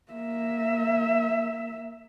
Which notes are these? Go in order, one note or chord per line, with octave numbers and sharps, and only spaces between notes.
A#3 E5